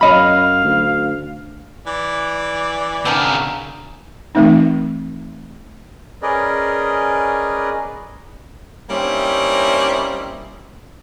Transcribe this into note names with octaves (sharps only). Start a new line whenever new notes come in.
F#2 C#5 D#5 F5 B5
D2
E3 D5
C#3 B3 C4 D4 A#4
E3 A3 C4 D#4
C#4 G#4 A#4 B4 D5 D#5
G3 A#3 C4 C#4 D#4 E4